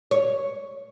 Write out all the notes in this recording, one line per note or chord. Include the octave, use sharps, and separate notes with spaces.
C#5